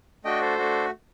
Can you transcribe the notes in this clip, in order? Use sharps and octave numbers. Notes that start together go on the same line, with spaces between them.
A3 D4 F#4 D#5 G5
A4 C5
A3 D4 F#4